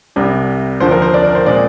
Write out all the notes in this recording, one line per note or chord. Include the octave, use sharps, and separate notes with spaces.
C2 C3 G3
D#2 D3 F3 C4 C5
A#4
C5
D4 D5
A#4
C5
A#2 G#3 C4 D4 D5